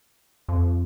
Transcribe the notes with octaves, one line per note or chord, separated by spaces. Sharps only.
F2